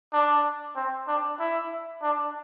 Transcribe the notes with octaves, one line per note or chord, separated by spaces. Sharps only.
D4
C4
D4
E4
D4